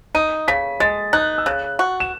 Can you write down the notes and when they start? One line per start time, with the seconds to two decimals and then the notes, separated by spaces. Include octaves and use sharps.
0.15 D#4 D#7
0.48 C#3 B6
0.80 G#3 A6
1.13 D#4 F#6
1.38 E6
1.46 C#3 F#6
1.79 F#4
2.00 E7